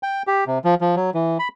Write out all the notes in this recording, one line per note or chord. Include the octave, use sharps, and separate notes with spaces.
G5
G4
C3
F3
F3
F#3
E3
B5